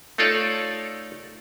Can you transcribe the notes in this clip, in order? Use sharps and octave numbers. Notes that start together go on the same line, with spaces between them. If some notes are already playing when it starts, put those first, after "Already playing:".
A3 D#4 F4 A4 C#5 D5